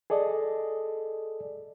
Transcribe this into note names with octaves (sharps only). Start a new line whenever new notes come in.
G#4 A4 D5 D#5